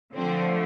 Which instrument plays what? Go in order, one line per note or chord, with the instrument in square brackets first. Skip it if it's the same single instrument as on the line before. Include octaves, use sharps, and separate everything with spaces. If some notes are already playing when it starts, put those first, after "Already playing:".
[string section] D3 F3 A3 C4